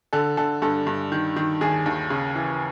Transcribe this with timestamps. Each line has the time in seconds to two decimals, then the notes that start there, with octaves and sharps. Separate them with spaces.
0.13 D3 A4
0.37 D3 A4
0.62 G2 A4
0.87 G2
1.12 D#3
1.36 D#3
1.61 D#2 G#4
1.86 D#2
2.10 C#3
2.35 E3